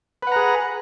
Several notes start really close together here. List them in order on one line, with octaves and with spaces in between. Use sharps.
B4 F#5 A#5 G#4